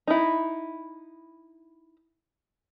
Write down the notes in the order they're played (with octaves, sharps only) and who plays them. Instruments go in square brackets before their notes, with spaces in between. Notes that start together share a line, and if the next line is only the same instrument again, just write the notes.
[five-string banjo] D#4 E4